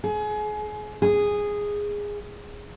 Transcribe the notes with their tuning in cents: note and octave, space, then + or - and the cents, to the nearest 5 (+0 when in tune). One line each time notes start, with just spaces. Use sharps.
G#4 +30
G#4 -10